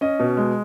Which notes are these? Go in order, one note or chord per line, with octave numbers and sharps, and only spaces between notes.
C#4 D#5
B2
G#3